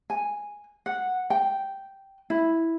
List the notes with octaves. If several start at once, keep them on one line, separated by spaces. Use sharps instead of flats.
G#5
F#5
G5
E4